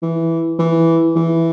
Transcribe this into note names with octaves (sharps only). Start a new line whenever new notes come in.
E3
E3
E3